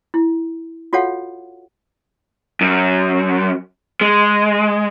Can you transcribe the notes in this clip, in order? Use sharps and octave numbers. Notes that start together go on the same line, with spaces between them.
E4
F4 F#4 A4 C#5 F5 F#5
F#2
G#3